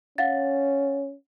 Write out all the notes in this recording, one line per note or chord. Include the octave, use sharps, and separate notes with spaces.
C#4 F5 F#5 A6